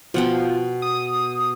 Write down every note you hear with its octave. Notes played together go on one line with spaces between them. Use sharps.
B2 F3 F#5 G5
D#6